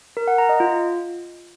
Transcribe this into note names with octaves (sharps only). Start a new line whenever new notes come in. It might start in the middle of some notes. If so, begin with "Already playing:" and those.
A#4
F#5
A#5
D#5
F4